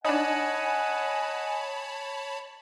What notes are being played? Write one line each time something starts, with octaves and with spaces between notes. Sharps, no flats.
D4 D#4 C#5 D#5 F#5 G#5 A5 B5